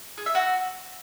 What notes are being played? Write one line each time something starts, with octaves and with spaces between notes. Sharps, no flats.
G#4
E5
F#4